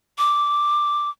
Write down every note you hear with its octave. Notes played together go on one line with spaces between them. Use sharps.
D6